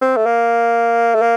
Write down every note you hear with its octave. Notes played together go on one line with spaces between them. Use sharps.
C4
A3
A#3
A3
A#3